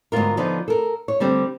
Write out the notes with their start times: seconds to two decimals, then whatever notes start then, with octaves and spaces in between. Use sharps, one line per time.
0.12 D2 G#2 B3 F4 A#4
0.37 D3 F3 B3 D#4
0.68 A4 A#4
1.08 C#5
1.20 D3 G3 C4